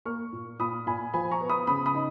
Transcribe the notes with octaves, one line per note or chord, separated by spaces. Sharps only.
A#3 C#6 F6
A#2
A#2 B5 D#6
A#2 G#5 B5
F3 G#5 B5
A#5 C#6
B3
B5 D#6
C#3 B5 D#6
B5 D#6
D#4